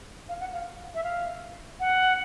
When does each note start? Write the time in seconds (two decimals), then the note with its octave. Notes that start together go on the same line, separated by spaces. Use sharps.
0.29 F5
0.40 F#5
0.54 F5
0.95 E5
1.03 F5
1.80 F#5